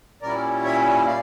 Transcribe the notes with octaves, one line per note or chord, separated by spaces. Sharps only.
A#2 G3 C#4 E4 A#4 D5
C#5 E5
D5 F5